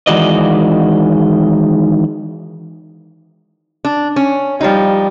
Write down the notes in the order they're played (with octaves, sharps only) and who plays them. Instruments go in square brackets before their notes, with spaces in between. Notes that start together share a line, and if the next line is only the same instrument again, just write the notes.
[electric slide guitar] D#3 E3 G#3 F#4 D5 D#5
[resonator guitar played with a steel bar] D4
C#4
[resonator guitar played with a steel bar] F3 D#4 [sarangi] G3